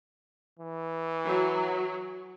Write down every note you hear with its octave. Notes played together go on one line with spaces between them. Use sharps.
E3
F#3